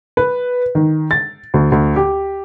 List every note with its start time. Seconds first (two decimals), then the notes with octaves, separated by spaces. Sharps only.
0.17 B4
0.75 D#3
1.11 A6
1.54 D2
1.72 D2
1.96 G4